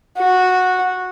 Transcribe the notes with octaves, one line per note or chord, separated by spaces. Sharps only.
F#4